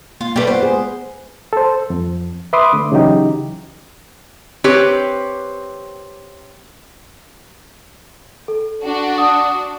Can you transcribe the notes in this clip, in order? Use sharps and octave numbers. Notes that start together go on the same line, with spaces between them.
A#3 F4
G3 A3 B3 B4
F4 C5 F#5
G#3 G#4
A4 C5
F2
B4 E5 B5 C6 D6 D#6
D3 A3
C#3 E3 F#3 D#4 G4
C4 G4 B4 C#5
A4
D4 F#4
F#5 D#6